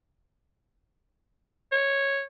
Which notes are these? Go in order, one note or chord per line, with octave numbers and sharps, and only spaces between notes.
C#5